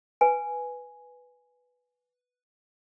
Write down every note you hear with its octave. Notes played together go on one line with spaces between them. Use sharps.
B4 G#5